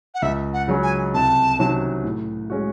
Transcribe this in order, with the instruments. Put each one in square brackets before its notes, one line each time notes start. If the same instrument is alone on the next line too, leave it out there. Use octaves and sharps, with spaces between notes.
[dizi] F#5
[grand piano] C#2 [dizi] E5
[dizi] F#5
[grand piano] C#3 F#3 C#4
[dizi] G#5
[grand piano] C2 [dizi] A5
[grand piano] C3 D#3 F#3 C#4
A2
G#3 C#4 F#4